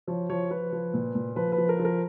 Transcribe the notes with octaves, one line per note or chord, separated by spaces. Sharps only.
F3 C#5
F3 C#5
F3 B4
F3
A#2
A#2
F3 B4
B4
F3
A#4
F3
A#4